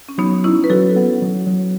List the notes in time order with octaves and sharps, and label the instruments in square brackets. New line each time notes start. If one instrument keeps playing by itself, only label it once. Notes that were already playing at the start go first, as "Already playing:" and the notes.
[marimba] C#4
[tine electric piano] F#3 [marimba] B3 D#4
[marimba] C#4 E4 [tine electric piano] D#4
[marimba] B4
[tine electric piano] F#3 [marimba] F#4 A4
[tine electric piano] B3
F#3
F#3